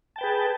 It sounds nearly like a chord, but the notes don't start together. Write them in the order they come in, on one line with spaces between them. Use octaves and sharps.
A5 G5 B4 G#4